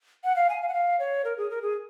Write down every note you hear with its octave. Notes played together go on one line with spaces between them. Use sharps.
F#5
F5
G#5
F5
F#5
F5
C#5
A#4
G#4
A#4
G#4